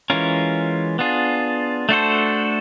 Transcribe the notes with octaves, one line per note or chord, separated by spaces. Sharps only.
E3 G#3 C#4 F4 A#4
B3 D4 F4 G#4
A3 D4 F#4 A4 C5